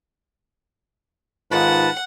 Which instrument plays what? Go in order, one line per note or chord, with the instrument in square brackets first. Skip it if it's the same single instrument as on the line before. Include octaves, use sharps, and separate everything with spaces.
[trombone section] G#2 D#3 F4 [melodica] B4 A5 [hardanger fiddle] F#5